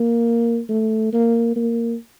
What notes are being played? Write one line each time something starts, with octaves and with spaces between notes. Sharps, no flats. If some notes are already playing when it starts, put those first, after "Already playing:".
Already playing: A#3
A3
A#3
A#3